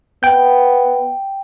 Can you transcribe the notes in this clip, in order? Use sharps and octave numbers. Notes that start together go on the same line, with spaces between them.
B3 G5 G6